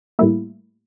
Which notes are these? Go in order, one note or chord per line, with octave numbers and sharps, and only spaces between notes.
A2 G3 A#3 E4